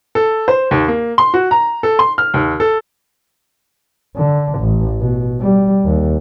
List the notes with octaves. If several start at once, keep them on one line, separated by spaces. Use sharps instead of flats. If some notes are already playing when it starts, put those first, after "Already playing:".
A4
C5
D#2
A#3
C6
F#4
A#5
A4
C6
F6
D#2
A4
D3
A1
B2
G3
D#2